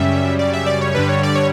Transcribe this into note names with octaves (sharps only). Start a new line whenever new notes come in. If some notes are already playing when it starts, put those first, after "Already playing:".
Already playing: F#2 C#3 G3 E5
D5
E5
D5
C#5
G2 D3 G3 B4
C#5
D5
C#5